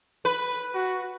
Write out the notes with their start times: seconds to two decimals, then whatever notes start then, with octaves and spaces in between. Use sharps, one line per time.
0.25 B4
0.74 F#4